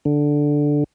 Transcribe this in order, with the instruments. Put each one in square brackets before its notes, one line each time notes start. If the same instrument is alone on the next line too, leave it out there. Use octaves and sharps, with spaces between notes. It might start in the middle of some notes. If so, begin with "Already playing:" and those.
[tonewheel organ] D3